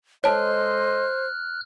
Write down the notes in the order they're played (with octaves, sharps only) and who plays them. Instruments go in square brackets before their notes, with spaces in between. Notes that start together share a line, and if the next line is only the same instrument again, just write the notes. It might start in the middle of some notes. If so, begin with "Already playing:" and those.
[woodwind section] G#3 A4 D#5 [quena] C5 [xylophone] C#5 A5 [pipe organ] F6 F#6